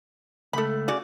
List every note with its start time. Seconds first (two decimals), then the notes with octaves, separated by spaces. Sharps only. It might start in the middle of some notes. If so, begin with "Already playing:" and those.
0.53 C#2 A3 A4 B5
0.88 C#3 F#4 D5